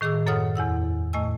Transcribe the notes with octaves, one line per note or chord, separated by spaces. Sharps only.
A2 D#3 G#4 D6 E6
F#2 A4 C#5 F#5 D#6 F6
E2 E4 F#5 E6
A2 A3 D#5 G#5 E6